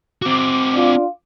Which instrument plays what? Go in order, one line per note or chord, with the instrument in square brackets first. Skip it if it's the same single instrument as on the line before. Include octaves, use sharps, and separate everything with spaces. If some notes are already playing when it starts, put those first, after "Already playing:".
[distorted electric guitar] C4 F#4 [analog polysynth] D6
[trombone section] D4 F4